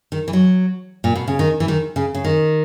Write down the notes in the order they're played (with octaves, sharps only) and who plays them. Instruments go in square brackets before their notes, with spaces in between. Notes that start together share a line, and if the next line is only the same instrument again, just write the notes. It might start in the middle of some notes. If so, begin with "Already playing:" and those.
[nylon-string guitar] D#3
E3
F#3
A#2
B2
C#3
D#3
E3
D#3
C#3
C#3
D#3